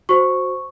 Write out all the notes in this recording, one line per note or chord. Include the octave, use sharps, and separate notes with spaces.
F#4 C5 C#6